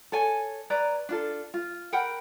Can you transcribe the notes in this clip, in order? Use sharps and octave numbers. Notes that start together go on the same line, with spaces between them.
A4 C#5 G#5
B4 C#5 D5 A#5
D4 F4 A4
F4
A#4 F#5 G5 B5